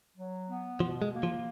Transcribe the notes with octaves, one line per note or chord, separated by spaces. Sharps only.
F#3
B3
B2 F3
G#3
A#3
F3